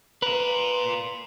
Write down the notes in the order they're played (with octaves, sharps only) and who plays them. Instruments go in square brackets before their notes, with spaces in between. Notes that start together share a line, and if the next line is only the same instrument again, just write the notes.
[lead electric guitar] F4 A#4 [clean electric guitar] B4